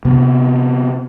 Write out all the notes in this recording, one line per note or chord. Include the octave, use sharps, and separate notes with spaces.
C3 B3